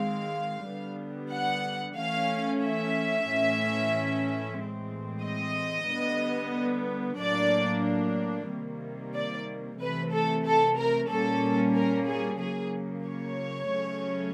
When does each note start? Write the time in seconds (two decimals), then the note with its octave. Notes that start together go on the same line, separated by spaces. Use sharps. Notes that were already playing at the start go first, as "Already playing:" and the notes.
Already playing: D#3 G#3 C4 F5
0.68 D3 G3 B3
1.32 F#5
1.97 E3 A3 C#4 F5
2.62 E5
3.28 A2 E3 A3 C#4
4.58 A2 E3 G#3 C4
5.24 D#5
5.89 D3 G3 B3
7.19 A2 F#3 A#3 D4 D5
8.49 C3 D#3 G3 A#3
9.15 D5
9.79 C3 E3 A3 B4
10.12 A4
10.45 A4
10.78 A#4
11.10 A#2 G3 A#3 C#4 A4
11.76 A#4
12.08 G#4
12.40 C#3 F#3 A#3 G#4
13.06 C#5
13.71 C#3 F#3 A3 C#4